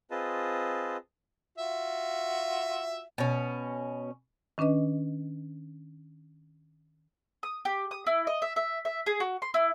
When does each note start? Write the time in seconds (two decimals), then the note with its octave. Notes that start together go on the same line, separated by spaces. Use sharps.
0.11 C4 F4 G#4 B4 D#5 A5
1.58 F4 F#4 E5
3.18 B2 C#4
4.58 D#3 C#4 D4 B4 D#5
7.43 D#6
7.65 G4
7.91 D#6
8.07 E4
8.27 D#5
8.42 E5
8.56 E5
8.85 E5
9.06 G#4
9.20 F#4
9.42 C6
9.54 E4